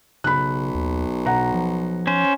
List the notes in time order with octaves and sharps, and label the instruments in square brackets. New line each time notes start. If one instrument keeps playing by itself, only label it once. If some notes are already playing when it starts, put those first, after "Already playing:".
[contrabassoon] B1 [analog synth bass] C#3 [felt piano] B5 F#6
[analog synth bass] D#2
[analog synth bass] B2 [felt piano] F#5 A#5
[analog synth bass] F3
[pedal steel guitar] C#4 C5